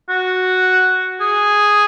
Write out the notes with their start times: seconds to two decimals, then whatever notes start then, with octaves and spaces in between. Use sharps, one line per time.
0.09 F#4
1.21 G#4